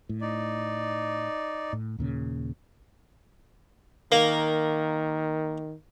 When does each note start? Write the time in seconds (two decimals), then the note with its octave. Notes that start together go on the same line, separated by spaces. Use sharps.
0.09 A2
0.21 D#4 D5
1.73 A2
1.98 D#2 A#2 C#3
4.12 D#3 A#3